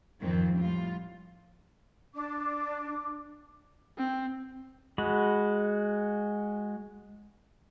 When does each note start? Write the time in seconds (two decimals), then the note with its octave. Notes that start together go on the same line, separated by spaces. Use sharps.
0.22 F2 G#2 D#3 C4
0.55 A2 G3 F4
2.14 D4 D6
3.98 C4
4.98 G#3 F#4 B5